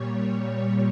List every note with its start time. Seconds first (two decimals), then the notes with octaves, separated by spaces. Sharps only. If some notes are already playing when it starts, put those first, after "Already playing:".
Already playing: A#2 G3 C#5